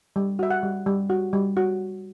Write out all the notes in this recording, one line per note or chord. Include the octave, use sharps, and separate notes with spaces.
G3
F#4 E5
F#5
G3
G3
F#4
G3
F#4